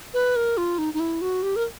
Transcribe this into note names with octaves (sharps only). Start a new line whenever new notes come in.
B4
A#4
F4
D#4
D#4
E4
F#4
G4
A#4